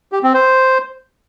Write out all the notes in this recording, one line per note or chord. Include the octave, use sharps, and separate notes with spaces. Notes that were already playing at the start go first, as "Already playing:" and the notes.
G4
C4
C5